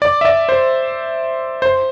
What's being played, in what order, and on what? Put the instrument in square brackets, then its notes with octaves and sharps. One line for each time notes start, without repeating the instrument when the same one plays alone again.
[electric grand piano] D5
E5
D5
C5
C5